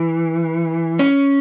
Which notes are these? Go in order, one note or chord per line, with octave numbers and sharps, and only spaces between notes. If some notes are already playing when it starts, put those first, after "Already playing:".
Already playing: E3
C#4